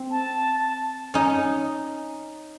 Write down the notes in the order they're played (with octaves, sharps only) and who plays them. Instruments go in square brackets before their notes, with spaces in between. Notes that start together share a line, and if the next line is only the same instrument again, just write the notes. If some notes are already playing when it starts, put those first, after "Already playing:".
Already playing: [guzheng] C4
[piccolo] A5
[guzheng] C#4 D#4